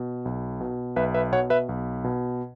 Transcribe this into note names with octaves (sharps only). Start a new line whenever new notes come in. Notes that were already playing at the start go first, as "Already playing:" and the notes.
Already playing: B2
B1
B2
B1 B4 E5
B4 E5
B2 C#5 F#5
B4 E5
B1
B2